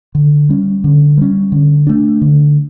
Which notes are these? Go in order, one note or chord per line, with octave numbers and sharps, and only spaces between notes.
D3
G3 C#4
D3
G3 C#4
D3
A3 D4
D3